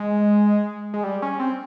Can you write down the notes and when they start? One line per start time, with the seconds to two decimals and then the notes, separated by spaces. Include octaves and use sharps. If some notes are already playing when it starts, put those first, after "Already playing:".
Already playing: G#3
0.94 G#3
1.04 G3
1.22 C#4
1.40 C4